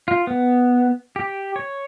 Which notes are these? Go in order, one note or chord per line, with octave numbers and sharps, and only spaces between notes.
F4
B3
G4
C#5